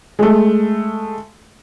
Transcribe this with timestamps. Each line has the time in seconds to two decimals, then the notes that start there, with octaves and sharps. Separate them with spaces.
0.19 G#3 A3